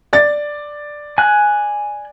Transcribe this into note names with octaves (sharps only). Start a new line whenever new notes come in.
D5 A6
G#5 F#6